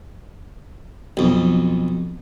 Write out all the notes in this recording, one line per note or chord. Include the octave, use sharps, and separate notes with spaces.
B1 F2